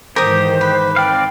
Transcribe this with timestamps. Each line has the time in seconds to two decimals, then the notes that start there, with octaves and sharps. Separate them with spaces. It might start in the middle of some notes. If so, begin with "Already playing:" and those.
0.16 G#2 D#3 E3 G4 A#4 C5 D#6
0.61 B4
0.96 C4 D5 F5 G5